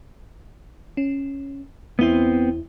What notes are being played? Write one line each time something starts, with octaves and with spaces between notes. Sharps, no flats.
C#4
E2 B3 C4 E4